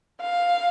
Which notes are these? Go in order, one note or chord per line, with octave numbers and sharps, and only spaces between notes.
F5